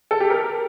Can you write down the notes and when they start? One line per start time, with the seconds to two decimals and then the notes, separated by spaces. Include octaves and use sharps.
0.11 A4
0.20 G4
0.30 A#4